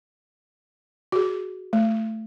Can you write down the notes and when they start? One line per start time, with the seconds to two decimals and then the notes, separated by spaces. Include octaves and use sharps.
1.12 F#4 G#4
1.73 A3